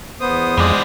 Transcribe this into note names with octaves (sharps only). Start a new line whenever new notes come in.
E2 B3 C5 D#6
F2 G#3 B3 D5